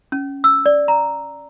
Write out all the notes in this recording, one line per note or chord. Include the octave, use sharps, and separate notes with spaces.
C#4
E6
D5
A#5